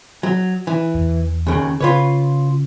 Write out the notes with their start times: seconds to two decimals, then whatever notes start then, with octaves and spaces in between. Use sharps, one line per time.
0.23 F#3
0.67 E3
0.94 E2
1.47 D#2 C#3
1.81 C#3 F4 B4 C#5